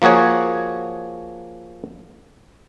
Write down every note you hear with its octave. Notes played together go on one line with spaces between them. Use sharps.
F3 A#3 F#4 G#4 C#5